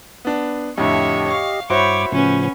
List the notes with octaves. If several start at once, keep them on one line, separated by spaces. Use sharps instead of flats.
B3 D4
F2 A2 D3 G4 C#5 D#5 E5
F5 C#6
G2 E4 F#4 C5 C#5 B5 D6
A2 C#3 F3 B3 C#4